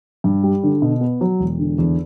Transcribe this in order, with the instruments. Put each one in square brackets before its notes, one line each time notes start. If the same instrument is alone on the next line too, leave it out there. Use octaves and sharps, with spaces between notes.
[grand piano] G2
G3
D3
B2
B3
F#3
E1
D3
E2